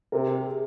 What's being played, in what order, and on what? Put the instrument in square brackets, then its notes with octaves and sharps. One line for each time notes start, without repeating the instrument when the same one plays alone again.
[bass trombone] C3 [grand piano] A#4
[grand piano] G4
G#4